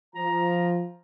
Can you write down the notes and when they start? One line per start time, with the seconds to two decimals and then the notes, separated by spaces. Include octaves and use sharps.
0.15 F3 A#5